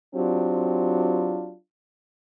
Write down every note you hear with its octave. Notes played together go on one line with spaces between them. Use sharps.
F#3 C4 D4 F4 G4